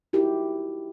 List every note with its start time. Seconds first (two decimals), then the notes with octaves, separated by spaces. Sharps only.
0.13 D#4 E4 F#4 G4 A#4